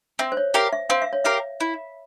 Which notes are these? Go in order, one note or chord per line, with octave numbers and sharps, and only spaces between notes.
C4 E5
C5
C#5
G4 A#4 E5 F5
E5
C4 F5
E5
C#5
G4 A#4 E5 F5
E4